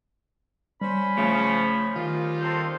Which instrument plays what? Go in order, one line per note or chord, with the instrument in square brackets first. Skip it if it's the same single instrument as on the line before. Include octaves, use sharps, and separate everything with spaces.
[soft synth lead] G3 [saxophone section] C#4 C5 [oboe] B5
[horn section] C#3 F3 [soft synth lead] A3
[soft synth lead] D#3 [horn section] G3 D#4 F4
[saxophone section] A#3 C4 A4 [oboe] C5